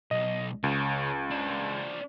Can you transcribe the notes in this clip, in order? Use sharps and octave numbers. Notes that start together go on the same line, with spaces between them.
B1 D#5
C#2 C#3
D4 C5